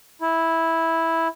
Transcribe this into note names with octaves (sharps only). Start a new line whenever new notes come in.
E4